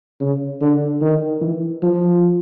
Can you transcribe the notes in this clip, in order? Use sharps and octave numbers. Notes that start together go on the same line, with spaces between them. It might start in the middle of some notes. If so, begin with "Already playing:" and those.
C#3
D3
D#3
E3
F3